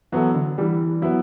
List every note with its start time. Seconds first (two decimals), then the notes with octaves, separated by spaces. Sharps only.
0.12 E3 F#3 B3 E4 A4
0.35 D3
0.58 E3 G3
1.02 F#3 B3 E4